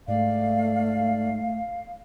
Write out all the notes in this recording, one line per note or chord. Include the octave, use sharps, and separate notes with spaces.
G#2 A3 D5 F5